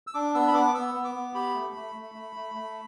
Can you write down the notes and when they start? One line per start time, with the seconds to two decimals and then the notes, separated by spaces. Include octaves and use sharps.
0.07 E6
0.14 D4 D6
0.35 B3 E6
0.48 B5
0.54 B3 D6
0.75 B3 E6
0.94 B3
1.05 D6
1.15 B3
1.35 G4 B5
1.55 A3
1.75 A3
1.95 A3
2.15 A3
2.36 A3
2.55 A3